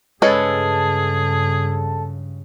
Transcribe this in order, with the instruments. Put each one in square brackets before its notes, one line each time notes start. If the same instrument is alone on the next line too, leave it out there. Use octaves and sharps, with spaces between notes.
[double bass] G2 C#3 [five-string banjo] G#3 C#4 B4 [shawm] G#4 [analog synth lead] A4